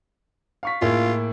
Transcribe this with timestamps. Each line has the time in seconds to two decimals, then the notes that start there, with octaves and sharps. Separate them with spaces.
0.63 F5 C#6 B6
0.81 A2 A#3 F4 G#4